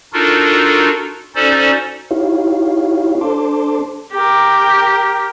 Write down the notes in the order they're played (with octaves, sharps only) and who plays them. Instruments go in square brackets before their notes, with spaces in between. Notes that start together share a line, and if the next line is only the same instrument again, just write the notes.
[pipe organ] D4 D#4 F4 F#4 A4 A#4
C#4 D#4 F#4 A4 C5 D5
[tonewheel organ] D#4 E4 F#4 G4 C#5 F5
D4 A4 C5 A5 C6 D6
[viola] G4 A#4